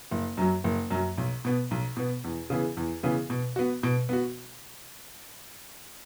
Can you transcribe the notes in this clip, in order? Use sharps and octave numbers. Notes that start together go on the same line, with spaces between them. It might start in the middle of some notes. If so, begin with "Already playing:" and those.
F#1
F#2 F#3
F#1
F#2 F#3
B1
B2 B3
B1
B2 B3
E2
C#3 E3 B3 G#4
E2
C#3 E3 B3 G#4
B2
B3 F#4
B2
B3 F#4